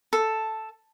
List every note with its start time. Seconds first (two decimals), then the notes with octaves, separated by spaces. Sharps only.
0.13 A4